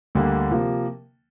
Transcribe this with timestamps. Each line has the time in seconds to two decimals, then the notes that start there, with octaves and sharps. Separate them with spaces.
0.15 D2 D3 G3 A#3 D4
0.50 C3 F3 A#3